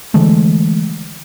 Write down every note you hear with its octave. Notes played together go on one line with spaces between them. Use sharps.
D3 E3 G#3 A3